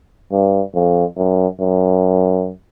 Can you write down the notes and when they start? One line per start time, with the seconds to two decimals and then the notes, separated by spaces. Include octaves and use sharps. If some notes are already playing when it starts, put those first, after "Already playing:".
0.32 G2
0.75 F2
1.17 F#2
1.60 F#2